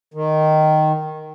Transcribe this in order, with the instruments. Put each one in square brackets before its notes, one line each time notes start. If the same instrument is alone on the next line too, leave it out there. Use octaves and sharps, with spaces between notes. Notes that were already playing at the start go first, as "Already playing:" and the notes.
[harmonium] D#3